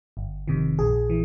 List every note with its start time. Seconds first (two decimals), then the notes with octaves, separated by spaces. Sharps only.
0.17 G1
0.48 F2 C3 D#3
0.79 A#1 G#4
1.10 E3